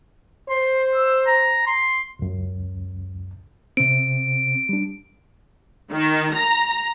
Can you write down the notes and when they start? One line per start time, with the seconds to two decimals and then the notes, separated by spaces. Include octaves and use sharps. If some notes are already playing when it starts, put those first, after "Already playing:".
0.49 C5 C6
0.95 E6
1.27 A#5
1.67 C6
2.19 C#2 F#2
3.77 C3 C4 D7
4.69 G3 D4
5.91 D#3
6.32 A#5